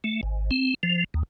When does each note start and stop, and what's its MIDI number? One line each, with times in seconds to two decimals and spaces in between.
0.04 0.21 57
0.23 0.50 32
0.51 0.74 60
0.83 1.04 53
1.14 1.23 39